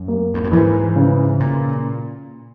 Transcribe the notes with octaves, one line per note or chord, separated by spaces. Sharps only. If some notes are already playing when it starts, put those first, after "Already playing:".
Already playing: F#2
A#3
E2
F#2
G#2 E3
C#3
A#2